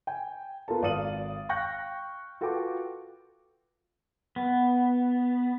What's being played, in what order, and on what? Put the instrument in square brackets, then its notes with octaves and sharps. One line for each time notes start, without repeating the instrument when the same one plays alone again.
[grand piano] G5 G#5
B3 F4 A4 A#4 A5
G#1 D5 F5 D#6 D#7 F#7
F5 G5 C#6 F#6 G6 A#6
F4 F#4 A4 B4 G5 D6
[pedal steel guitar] B3